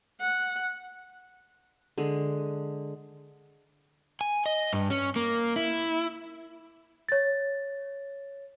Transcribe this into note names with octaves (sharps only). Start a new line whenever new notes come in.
F#5
D3 G#3
G#5
D#5
G2
C#4
A#3
E4
C#5 A6